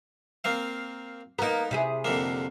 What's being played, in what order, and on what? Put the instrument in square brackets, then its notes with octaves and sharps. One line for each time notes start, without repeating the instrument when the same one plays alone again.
[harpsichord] A#3 C4 F5
[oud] A#3 A#4 [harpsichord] B3 D#4
[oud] C3 E4 G#4
[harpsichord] F2 D3 A#3